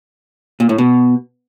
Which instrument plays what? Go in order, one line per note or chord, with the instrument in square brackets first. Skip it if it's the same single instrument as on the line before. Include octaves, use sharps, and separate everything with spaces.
[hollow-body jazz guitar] A#2
A2
B2